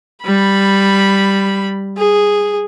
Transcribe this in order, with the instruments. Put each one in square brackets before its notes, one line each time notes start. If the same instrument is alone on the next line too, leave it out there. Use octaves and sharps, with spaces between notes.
[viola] G3 B5
G#4